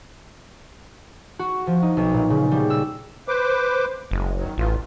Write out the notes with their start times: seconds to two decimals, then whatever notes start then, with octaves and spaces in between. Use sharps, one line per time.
1.39 F#4
1.67 F3
1.82 D#4
1.97 B1
2.14 A#2
2.30 C#3
2.51 G3
2.70 E6
3.28 B4 C5 D6
4.11 F#1 G#3
4.37 D#3 F#3
4.58 A1 E3 F4